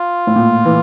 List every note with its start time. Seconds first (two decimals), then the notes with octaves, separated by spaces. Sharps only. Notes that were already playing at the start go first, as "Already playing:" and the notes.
Already playing: F4
0.27 A2
0.36 A#2
0.65 E3